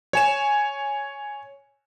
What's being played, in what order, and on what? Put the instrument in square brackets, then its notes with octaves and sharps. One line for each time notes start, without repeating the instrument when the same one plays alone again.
[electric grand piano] C#5 G#5 E7